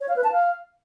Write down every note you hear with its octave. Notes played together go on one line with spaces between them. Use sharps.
C#5
F5
B4
A5
F5